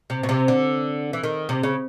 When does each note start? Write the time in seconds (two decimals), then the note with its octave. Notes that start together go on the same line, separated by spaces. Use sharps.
0.10 C3
0.23 B2
0.29 C3
0.48 D3
1.13 E3
1.24 D#3
1.49 C3
1.63 C#3